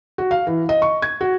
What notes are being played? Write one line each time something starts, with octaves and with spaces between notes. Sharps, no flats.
F#4
F5
E3
D#5
C#6
G#6
F#4